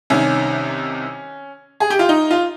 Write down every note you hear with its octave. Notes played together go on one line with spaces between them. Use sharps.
C2 C3 D#3 C#4
G#4
G4
F4
D#4
F4